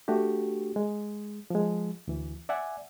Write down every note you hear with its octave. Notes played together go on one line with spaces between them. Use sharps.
A3 D4 F#4 G4
G#3
F3 G#3
D2 E3
D5 E5 F#5 G#5